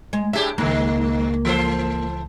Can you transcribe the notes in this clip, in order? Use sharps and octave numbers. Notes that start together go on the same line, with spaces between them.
G#3
A2 A3 D4 G4 G#4 E5
C#2 G2 D#3 A#3
E3 A4 C5